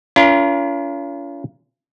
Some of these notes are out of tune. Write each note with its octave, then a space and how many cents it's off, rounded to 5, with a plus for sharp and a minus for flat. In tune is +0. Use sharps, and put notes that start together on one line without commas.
C#4 +40 F4 -35 A#4 +20